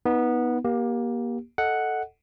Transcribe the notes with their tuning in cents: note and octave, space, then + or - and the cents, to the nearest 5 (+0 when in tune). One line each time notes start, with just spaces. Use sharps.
B3 -15 D#4 +20
A#3 +30 G4 +0
A4 +0 D#5 +10 F#5 +0